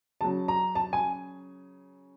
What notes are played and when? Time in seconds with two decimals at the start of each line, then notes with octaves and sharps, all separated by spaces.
0.21 C#3 F#3 A5
0.48 A#5
0.75 A5
0.93 G#5